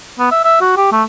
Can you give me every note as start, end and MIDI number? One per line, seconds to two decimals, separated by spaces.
0.19 0.30 59
0.32 0.44 76
0.44 0.58 76
0.61 0.74 66
0.77 0.87 67
0.92 1.03 57